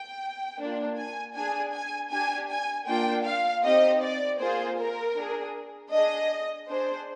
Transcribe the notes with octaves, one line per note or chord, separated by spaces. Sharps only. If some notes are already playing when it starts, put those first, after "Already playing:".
Already playing: G5
A#3 D4 F4
G#5
D4 G#4 G#5
G#5
D4 G4 G#5
G#5
A#3 D4 F4 G5
F5
C4 D#4 G4 D#5
D5
A#3 F4 G#4 C5
A#4
D4 G#4
D4 G#4 D#5
D4 G#4 C5